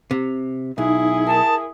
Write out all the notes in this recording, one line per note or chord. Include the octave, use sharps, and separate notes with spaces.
C3
B1 D#4 E4 G#4
A#4 A5 D#6